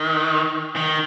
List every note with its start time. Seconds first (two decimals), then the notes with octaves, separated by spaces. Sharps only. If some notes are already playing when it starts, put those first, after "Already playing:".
Already playing: D#3
0.76 D#3